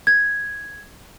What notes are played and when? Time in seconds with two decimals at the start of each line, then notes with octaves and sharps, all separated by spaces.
0.07 G#6